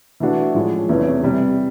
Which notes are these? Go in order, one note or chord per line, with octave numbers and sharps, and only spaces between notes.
E3 A3 D4 F#4
A2 F3 G#3 C#4
E2 C3 E3 A3 C#4
C3 E3 G3